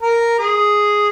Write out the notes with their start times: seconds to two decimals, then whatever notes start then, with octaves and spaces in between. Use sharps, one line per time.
0.02 A#4
0.39 G#4